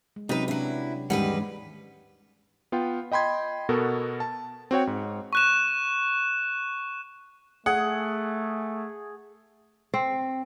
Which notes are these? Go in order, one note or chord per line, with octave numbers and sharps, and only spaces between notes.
G#3
C3 F#3 C#4 D#4 F#4 B4
F#3 D4 E4
D#2 G#2 E3 G3 G#3 C#4 B4 F#5
B3 F4 F5 G5
D#5 G5 B5 C6 G#6
B2 B3 F#4 A4 A#4
A5
C4 F#4 C#5 G5
G#2
C#6 F#6 E7
A3 G#4 F#5
C4